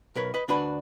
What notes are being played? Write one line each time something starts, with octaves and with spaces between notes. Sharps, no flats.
B1 A#4 B4 C#5
B4 D#5
D2 D4 F#4 B4 B5